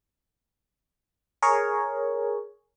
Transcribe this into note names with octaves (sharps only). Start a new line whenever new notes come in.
G#4 A#4 C#5